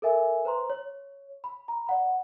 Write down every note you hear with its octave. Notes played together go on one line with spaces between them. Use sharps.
A4 A#4 E5 G#5
B4 C5 A#5 C6
C#5
B5
A#5
D5 F#5 B5